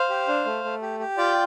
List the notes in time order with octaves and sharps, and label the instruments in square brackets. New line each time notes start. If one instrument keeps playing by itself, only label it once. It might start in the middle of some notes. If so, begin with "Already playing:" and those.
Already playing: [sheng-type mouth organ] C5 F5
G4
D4
A3
A3
G4
G4
F4 D5 G5